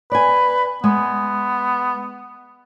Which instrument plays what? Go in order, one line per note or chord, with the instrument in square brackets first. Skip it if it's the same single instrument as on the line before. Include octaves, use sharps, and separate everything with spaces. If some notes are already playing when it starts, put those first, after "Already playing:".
[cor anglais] B4 [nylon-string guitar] D5 G#5
[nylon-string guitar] G#3 [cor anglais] B3